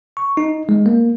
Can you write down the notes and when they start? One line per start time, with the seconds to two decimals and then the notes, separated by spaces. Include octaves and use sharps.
0.17 C#6
0.37 D#4
0.69 G#3
0.86 A#3